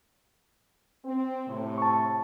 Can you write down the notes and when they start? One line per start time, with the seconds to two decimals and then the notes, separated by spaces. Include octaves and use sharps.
1.04 C4
1.48 A2 C3
1.78 A5 C#6